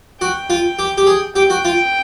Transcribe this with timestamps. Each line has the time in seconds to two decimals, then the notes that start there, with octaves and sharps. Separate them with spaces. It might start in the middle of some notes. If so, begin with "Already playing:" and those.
0.21 F#4 G5
0.50 F4
0.79 G4
0.98 G4
1.07 G#4
1.35 G4 G5
1.50 F#4
1.65 F4